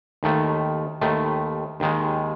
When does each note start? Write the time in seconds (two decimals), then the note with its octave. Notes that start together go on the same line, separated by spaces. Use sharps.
0.23 D#2 D#3 A3
1.01 D#2 D#3 A3
1.80 D#2 D#3 G#3